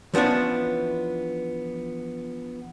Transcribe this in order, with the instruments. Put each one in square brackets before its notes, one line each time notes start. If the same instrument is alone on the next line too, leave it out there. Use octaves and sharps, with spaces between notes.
[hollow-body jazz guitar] E3 F3 B3 C#4 D4